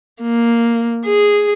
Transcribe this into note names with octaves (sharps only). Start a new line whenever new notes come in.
A#3
G#4